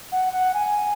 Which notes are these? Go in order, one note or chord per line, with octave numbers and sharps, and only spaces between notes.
F#5
F#5
G#5